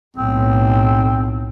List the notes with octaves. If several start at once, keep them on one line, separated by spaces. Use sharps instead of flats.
B1 A2 C4